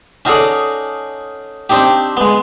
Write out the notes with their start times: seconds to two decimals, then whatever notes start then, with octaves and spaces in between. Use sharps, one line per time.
0.25 C#4 D#4 F#4 G#4 A4 D5
1.70 C4 D4 D#4 G4
2.17 G#3 B3